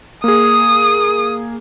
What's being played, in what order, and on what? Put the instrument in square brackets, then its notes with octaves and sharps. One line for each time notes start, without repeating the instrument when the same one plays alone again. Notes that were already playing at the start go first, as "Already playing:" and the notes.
[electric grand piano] A#3 G#4 [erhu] D#6